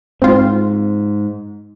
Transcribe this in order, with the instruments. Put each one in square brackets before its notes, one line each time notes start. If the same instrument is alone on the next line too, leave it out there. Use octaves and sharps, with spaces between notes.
[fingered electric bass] G#2 [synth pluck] C4 F4